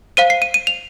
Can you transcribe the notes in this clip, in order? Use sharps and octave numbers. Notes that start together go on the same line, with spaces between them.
C5 F5 D#7
C7
D#7
D#7
F7